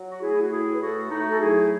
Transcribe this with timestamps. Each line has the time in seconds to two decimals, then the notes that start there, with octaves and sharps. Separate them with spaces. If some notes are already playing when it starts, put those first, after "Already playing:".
Already playing: F#3
0.10 F#4
0.20 A3 E4 G#4
0.32 E4
0.41 F#4
0.50 A2 E4 G#4
0.72 B4
0.80 A3 F#4 A4
1.10 A3 D#4 F#4
1.28 A4
1.40 F#3 E4 G#4